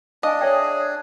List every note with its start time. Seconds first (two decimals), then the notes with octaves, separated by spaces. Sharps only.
0.23 D4 D#5 F5 G#5
0.41 G#4 C#5 E5 G5